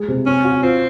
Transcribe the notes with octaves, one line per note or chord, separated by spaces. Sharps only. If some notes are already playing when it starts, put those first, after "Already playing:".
Already playing: G#3 G#4
C3
C4 C#4
F#4
C4 F4